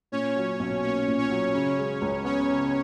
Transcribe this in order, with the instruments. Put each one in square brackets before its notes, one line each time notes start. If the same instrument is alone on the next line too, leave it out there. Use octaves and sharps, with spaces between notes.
[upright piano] A#2 [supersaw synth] C#4 C#5
[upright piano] F#3
B1
[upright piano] A#3 [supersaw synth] C#4 C#5
[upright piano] A#2
[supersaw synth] C#4 C#5
[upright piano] F#3
[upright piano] C#3 [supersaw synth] C#4 C#5
[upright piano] G#3
C#2
[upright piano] B3 [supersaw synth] C#4 C#5
[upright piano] C#3